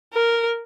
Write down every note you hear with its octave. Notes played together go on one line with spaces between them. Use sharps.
A#4